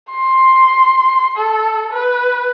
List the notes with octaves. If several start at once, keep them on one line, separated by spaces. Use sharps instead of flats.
C6
A4
B4